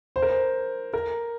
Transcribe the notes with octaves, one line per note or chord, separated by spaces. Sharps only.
C5
A#4
C5
A#4